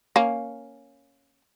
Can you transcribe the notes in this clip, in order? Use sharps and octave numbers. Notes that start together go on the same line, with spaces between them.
A#3 C#4